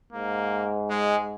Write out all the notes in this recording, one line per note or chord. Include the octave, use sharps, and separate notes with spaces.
G#2 A#3
G#3